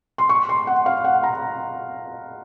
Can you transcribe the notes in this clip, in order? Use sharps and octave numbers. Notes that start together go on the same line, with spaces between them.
C6
C#6
C6
F#5
F5
F#5
A#5